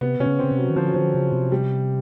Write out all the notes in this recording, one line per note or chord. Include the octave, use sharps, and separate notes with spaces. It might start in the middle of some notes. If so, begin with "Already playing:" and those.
C3 B3
C3 C#4
C#3
C#3 C4
C3
F#3
D#3
D3 F3
F#3
D3 F3
C#3
C3
G3